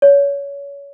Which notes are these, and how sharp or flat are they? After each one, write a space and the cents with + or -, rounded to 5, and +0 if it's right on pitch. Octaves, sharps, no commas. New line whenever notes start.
C#5 +25